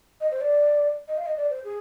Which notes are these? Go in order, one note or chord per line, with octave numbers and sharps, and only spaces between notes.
D#5
C5
D5
D#5
F5
D#5
D5
C5
G#4